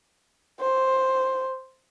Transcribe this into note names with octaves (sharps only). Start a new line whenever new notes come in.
C5